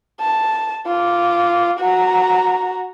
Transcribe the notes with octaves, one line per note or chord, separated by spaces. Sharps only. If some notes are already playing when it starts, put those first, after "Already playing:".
A5
F4 D6
F#4 A#5